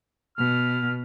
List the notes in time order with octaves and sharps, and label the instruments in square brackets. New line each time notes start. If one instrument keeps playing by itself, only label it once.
[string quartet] B2 [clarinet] F6